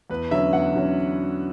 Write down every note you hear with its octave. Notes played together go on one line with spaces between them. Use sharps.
E2 B4
D3 F#3 C#4 E5
E2 F#5
D3 F#3 C#4